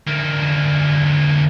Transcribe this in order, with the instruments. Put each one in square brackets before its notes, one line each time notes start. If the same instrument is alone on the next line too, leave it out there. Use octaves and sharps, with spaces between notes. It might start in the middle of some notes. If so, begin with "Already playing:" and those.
[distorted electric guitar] D2 A#3